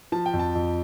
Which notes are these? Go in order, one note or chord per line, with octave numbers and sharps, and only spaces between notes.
F3 A5
G5
F2
A5
F2